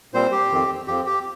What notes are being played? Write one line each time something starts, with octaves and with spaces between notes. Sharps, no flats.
A#2 G3 C4 C5
G4
F2 D#3 C4
F2 F3 C4 G4
G4